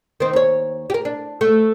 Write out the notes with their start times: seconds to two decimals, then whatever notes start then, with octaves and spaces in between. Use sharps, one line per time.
0.20 D#3 C4
0.33 D#2 C#5
0.90 G4 A#4
1.05 D4
1.41 A3